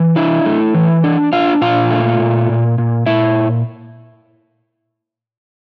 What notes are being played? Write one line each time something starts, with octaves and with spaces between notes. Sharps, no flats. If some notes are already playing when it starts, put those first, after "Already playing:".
Already playing: E3
D4 E4 E5
A3
E3
D4
D4 F4 F5
A#2 F4 F5
A3
A#2
A#2
A#2
A#2 E4 E5